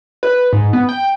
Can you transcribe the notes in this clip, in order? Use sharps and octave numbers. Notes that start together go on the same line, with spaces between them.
B4
G#2
B3
G5